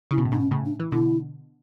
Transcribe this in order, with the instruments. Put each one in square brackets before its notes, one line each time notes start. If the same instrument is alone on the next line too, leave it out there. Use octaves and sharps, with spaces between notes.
[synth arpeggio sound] C#3 [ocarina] E4
[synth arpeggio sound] B2
A2
[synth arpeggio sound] G#2 B2 [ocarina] D4
[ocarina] C#4
[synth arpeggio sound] A2 C#3
[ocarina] D4
[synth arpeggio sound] E3
[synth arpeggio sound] B2 D3 [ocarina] E4